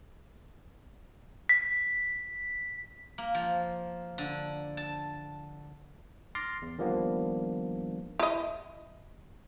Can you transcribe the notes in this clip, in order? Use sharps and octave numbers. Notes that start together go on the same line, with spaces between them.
B6
A#3
F3
D3
A5
C6 D6 F6 A6 A#6 C7
E2
D#3 F3 G3 A#3 B3 D4
E4 D#5